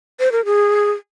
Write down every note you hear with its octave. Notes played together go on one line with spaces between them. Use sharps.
C5
A#4
G#4